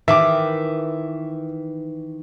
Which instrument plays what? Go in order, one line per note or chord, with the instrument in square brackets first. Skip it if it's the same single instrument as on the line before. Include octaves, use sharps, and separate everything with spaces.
[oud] D#3 E3 [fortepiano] E5 D6